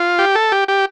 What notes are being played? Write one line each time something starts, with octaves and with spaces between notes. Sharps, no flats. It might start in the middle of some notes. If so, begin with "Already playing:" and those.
Already playing: F4
G4
A4
G4
G4